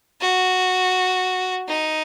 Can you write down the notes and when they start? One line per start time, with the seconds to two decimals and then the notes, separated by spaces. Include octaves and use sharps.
0.21 F#4
1.69 D#4